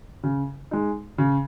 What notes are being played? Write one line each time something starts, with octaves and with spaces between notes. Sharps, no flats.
C#3
G#3 D#4
C#3